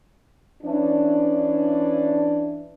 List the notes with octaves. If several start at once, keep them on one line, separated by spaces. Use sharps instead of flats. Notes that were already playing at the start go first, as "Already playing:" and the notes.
E3 C#4 D4